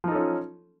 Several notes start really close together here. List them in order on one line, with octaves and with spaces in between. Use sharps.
F3 D#4 A4 C#4 F4